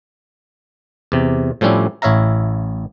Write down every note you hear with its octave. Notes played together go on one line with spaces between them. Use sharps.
E2 C3
A2 F3 G3 C#4 D4 E4
A1 E4 C#5 E5 F5 A#5